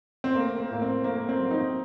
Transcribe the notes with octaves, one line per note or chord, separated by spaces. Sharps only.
C4
A3 A#3
A#3
A2 A#3
C4
A3 A#3
A#3
C4
F#3
C4 D#4